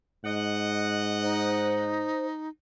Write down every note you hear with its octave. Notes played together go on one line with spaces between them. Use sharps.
G#2 D#5 F#5
D#4 C5